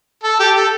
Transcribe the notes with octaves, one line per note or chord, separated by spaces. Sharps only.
A4
G4
A4